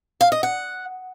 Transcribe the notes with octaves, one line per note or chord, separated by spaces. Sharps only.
F5
D#5
F#5